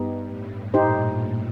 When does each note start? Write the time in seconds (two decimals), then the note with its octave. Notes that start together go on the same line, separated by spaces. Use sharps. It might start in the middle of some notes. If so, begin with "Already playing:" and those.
Already playing: G2 B3 D#4 G4
0.27 A2
0.74 A#2 D#4 G4 C5
1.05 A#2